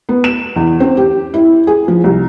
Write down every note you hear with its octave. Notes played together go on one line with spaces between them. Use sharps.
B3
E7
E2
C4
G4
E4
G#4
F3
C2